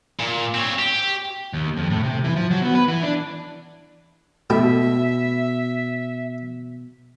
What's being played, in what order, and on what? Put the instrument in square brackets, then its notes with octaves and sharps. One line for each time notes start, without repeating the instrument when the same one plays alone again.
[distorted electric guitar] A#2
C4 C#5
G4
[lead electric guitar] D#2
F2
A2
C3
E3
F3
F#3
B3
B4
E3
D4
[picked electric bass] B2 [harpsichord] A3 E4 G4 [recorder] E5